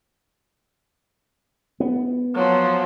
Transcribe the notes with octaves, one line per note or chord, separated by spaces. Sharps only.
B3
F3 F#3